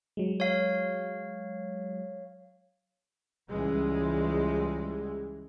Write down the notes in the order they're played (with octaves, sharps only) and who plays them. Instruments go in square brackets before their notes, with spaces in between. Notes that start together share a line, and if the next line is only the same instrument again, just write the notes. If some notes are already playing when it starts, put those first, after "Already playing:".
[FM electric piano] F#3 G#3
[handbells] C#5 F5
[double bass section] C#2 E3 G3 G#3